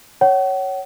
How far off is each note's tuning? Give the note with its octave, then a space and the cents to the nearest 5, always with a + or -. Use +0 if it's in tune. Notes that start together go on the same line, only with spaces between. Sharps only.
C#5 +0 F#5 +40